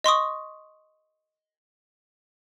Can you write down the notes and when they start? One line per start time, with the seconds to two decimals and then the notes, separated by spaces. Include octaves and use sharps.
0.04 D#5 C6 C#6 D#6